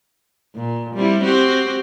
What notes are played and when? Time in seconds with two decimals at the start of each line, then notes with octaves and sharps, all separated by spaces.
0.55 A#2
0.95 G3 C4 E4
1.24 C4 F#4 G4